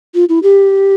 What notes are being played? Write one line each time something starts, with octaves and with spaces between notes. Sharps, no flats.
F4
E4
G4